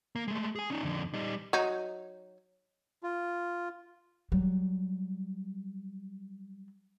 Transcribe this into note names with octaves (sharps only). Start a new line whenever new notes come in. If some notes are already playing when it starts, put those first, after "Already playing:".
A#3
G#3 A3
G#4 G#5
C#4 D#4
F2 D3
G3 D#4
F#3 D#4
F4
F#3 G3